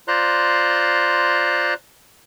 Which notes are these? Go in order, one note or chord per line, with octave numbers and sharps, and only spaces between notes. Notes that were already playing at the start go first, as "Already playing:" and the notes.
F4 C5 D5 A#5 C6 F#6